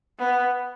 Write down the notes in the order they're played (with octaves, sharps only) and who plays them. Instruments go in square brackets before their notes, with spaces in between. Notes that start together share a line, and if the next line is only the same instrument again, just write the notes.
[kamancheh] B3